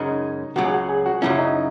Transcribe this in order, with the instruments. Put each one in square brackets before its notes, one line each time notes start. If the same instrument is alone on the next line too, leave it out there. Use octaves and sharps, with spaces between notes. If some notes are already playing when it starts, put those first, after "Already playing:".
Already playing: [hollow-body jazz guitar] F#2 C#3 G#3 C#4 [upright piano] D#4
[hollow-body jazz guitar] C#2 C#3 F#3 [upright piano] F#4
[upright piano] G#4
F#4
G#4
F#4
[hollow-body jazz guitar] F#2 C#3 F#3 C#4 [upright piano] E4
[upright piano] D#4